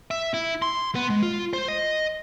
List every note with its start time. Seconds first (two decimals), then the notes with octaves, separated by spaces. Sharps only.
0.11 E5
0.34 E4
0.62 C6
0.95 B3
1.10 G#3
1.23 F4
1.53 C5
1.68 D#5